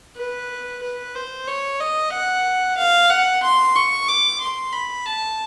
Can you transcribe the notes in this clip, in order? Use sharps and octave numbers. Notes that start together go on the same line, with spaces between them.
B4
B4
C5
C#5
D#5
F#5
F5
F#5
C6
C#6
D6
C6
B5
A5